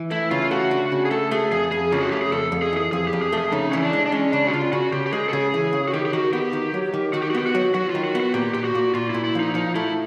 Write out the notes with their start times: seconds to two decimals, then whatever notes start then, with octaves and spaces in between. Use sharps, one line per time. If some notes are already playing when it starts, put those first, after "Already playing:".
Already playing: E3
0.11 A3 E4
0.31 C#3 F4
0.51 A3 F#4
0.71 D4
0.92 C#3
1.05 G#4
1.11 A3 A4
1.31 A3 G#4
1.52 F2 G#4
1.71 F2 G#4
1.92 C#3 F4
2.01 F#4
2.11 A3 G4
2.21 G#4
2.32 F2 A4
2.52 F2
2.62 G#4
2.73 E3 G#4
2.92 F2 G#4
3.07 G4
3.13 F2
3.22 G#4
3.32 A3
3.38 G#4
3.52 C#3 D#4
3.71 E3 C#4
3.82 D4
3.93 G#3
4.06 D4
4.12 G#3 C#4
4.32 C#3 D4
4.47 F#4
4.53 C#3 F4
4.72 C#3 F#4
4.92 C#3 G4
5.06 G4
5.13 G#3 G#4
5.29 A4
5.33 C#3 G#4
5.54 E3
5.73 C#3
5.88 F#4
5.94 D#3 G4
6.05 G4
6.13 D#3 F#4
6.33 B3 G4
6.53 D#3
6.74 F#3
6.93 D#3
7.13 D#3 F#4
7.22 G4
7.30 F#4
7.35 B3 G4
7.46 F#4
7.55 F#3
7.74 F#3 F#4
7.90 F4
7.95 D#3
8.04 F#4
8.15 B3
8.20 F#4
8.34 A#2 G4
8.54 A#2 G4
8.64 F#4
8.75 A#2
8.94 A#2 F4
9.10 A#2 E4
9.24 E4
9.35 F3 D#4
9.54 F3 D#4
9.75 A3 E4